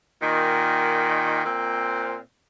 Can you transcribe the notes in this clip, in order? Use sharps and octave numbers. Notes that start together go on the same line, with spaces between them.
A#2 D#3
A#2 C4